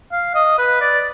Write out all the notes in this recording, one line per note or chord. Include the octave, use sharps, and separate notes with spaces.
F5
D#5
B4
D5